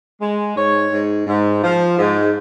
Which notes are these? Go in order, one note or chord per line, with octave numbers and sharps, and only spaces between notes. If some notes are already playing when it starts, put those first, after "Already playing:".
G#3
G#2 C#5
G#2
G#2
F3
G#2